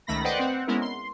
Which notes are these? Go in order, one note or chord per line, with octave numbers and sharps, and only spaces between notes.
C#2 D#3 A3 B5 A#6
B4 C5 D5 D#5 F#5 G5
C4 F#5
G#3 B3 C#4 E4 A#4
C6